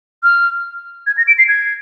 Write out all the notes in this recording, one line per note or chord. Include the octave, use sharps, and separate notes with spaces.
F6
G#6
A#6
D7
C7
G#6